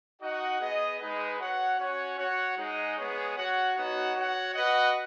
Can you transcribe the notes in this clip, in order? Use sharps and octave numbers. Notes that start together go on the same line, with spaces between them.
D#4 F#4 D#5 F#5
B3 G#4 D#5
G#3 D#4 G#4 B4
F#4 C#5 F#5
C#4 F#4 C#5 F#5
F#4 C#5 F#5
G#3 D#4 G#4 D#5 F#5
G#3 B3 G#4 C#5
F#4 C#5 F#5
B3 D#4 F#4 C#5 F#5
F#4 C#5 F#5
F#4 B4 D#5 F#5